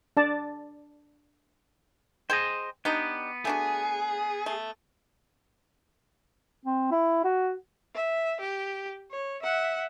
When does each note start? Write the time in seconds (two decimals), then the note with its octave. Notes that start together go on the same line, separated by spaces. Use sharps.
0.17 D4 D5 A5
2.30 G#4 C5 D#5 F#5 G5
2.85 B3 D4 D#4 G4
3.45 A3 D4 F#4 G#4
4.46 A3
6.65 C4
6.92 E4
7.24 F#4
7.95 E5
8.41 G4
9.11 C#5
9.42 E5 F#5